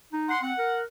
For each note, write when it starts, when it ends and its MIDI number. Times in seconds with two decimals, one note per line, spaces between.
0.13 0.32 63
0.29 0.42 78
0.29 0.42 84
0.42 0.53 60
0.42 0.79 78
0.58 0.84 70